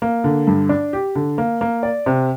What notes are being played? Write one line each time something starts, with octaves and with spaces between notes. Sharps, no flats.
A#3
D3
G2
D4
G4
D3
A#3
A#3
D5
C3